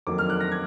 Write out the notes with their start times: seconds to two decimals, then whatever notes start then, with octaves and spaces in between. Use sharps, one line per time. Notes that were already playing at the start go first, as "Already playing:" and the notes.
0.07 F2 D#3 F#3 A#3 D6
0.18 F6
0.29 F#6
0.40 A#6
0.52 G#6